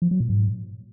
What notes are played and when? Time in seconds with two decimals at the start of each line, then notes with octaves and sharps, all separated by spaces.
0.02 F3
0.11 F#3
0.20 A#2
0.30 G#2